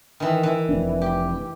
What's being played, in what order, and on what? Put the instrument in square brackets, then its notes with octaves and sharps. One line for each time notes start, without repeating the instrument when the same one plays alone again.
[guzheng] D#3 E3
E3
[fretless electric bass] F1 D4
[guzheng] G4